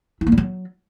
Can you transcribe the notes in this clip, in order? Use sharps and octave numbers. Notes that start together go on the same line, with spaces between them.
E4
A#3
G3
F#3